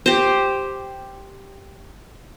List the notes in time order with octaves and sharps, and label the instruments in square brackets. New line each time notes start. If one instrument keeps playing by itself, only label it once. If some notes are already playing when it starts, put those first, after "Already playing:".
[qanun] G4 C5